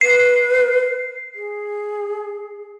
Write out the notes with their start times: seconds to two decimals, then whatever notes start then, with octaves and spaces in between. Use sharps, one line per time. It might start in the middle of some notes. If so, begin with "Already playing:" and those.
0.01 B4 C7
1.35 G#4